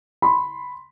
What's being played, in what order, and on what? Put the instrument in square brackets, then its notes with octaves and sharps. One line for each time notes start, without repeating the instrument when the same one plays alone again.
[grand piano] B5 C6